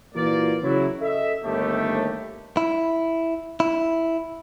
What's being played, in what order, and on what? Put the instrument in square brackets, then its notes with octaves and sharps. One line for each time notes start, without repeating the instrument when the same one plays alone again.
[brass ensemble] A#2 E3 A#3 F4 F#4 D5
C#3 F#3 E4
A4 D#5 E5
G1 D#2 A3 G4
[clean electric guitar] E4
E4